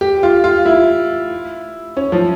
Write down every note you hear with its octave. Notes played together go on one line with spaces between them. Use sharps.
G4
F4
F4
E4
C#4
F3